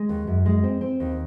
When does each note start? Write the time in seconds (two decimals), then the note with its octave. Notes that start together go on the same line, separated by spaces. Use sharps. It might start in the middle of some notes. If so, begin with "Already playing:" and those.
Already playing: G#3
0.09 D#2
0.27 F#2
0.46 G#3
0.64 C4
0.81 C4
1.00 D#2